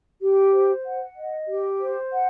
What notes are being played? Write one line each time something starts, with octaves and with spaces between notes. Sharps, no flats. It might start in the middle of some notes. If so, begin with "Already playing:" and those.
G4
C5
F#5
D#5
G4
C5
F#5